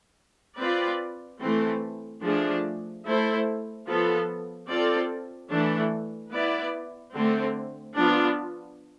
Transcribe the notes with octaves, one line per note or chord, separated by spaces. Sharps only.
C4 F4 B4 D5
E3 A3 C4
F3 A3 D4 G#4
A3 E4 A4 C5
F3 B3 F4 A4
C4 F4 A4 D5
E3 A3 D4
B3 E4 B4 D5
D3 A3 C4
F3 B3 D4 F4